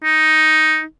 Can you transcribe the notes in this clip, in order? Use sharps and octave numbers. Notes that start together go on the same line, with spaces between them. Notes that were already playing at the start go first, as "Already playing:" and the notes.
D#4